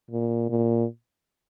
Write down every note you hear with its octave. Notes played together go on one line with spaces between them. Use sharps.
A#2
A#2